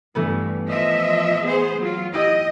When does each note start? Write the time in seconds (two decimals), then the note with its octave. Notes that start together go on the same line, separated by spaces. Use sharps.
0.15 G2 E3 A3 B3
0.68 F3 D#5 E5
1.43 B3 G#4 C5
1.78 F#3 F4
2.14 E4 G4 D#5